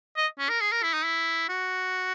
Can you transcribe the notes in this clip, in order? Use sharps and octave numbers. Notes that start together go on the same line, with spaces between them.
D#5
C#4
A#4
G#4
A#4
E4
D#4
E4
F#4